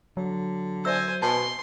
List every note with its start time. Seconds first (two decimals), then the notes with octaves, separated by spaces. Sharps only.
0.17 D3 F#3
0.85 C5 D5 E5 G#5 E6
1.22 B2 G#5 A5 C6